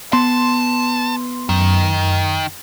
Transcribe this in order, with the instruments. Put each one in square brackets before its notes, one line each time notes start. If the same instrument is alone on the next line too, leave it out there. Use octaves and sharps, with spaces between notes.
[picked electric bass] B3 [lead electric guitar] A5 [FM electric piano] C6
[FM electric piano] F#2 [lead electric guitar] D#3